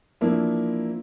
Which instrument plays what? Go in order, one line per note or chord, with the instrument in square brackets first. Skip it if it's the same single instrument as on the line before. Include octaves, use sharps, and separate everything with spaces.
[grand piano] E3 F3 A#3 C4 D4 E4